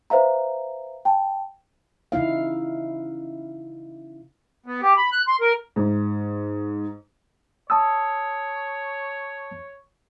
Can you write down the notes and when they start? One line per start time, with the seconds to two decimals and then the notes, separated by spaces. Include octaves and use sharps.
0.10 B4 C5 E5 F5 A#5
1.05 G5 A5
2.12 C#3 D#4 E4 F5
4.66 B3
4.82 G4
4.97 B5
5.12 F#6
5.28 C6
5.41 A#4
5.76 G#2
7.70 C#5 A5 D#6 E6